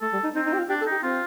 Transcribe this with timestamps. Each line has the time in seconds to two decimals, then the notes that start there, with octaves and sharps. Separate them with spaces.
0.01 A3 A4
0.13 G3
0.24 D#4
0.35 C4 D#4
0.46 D#4
0.53 G4
0.58 F4
0.69 D4 G4
0.81 A4
0.86 D#4 G4
1.03 C4 F4